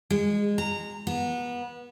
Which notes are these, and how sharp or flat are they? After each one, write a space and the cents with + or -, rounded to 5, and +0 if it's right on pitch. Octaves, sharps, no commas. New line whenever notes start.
G#3 -20
A#5 -20
B3 -25